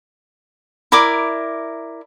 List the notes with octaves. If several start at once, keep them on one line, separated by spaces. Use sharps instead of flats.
E4 A#4 D5 D6